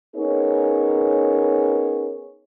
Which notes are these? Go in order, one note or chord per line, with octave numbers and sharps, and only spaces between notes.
B3 C#4 D#4 G#4 A#4 C#5